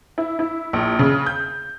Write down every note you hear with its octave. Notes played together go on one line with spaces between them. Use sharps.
E4
E4
A#1
C#3
G6